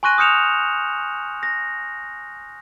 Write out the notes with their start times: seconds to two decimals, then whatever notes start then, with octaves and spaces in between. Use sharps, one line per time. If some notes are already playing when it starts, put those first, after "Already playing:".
0.03 G#5 C6 C#6 F#6 A#6 D#7
0.18 D#6 F6 G6 C#7 E7 F7
1.43 A#6